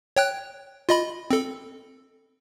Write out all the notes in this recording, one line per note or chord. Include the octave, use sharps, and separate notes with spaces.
C#5 G5 F#6
F4 D#5 B5
C4 A4